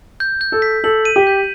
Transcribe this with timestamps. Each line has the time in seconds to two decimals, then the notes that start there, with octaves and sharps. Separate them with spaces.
0.20 G6
0.41 G6
0.52 A4
0.62 B6
0.84 A4 F#7
1.05 D#7
1.16 G4
1.27 G6